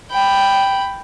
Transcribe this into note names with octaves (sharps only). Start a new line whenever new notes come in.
G5 B5